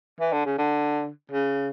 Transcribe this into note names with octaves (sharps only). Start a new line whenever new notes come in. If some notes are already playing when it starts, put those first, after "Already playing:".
E3
D3
C#3
D3
C#3